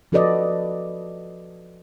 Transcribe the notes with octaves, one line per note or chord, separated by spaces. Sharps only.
F3 F#4 A4 B4 D5 D#5